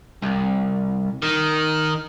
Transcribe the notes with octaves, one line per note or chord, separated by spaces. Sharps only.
C2
D#3